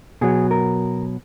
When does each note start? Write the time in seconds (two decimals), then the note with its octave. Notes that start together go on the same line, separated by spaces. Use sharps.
0.21 B2 F#3 G#4
0.51 A#4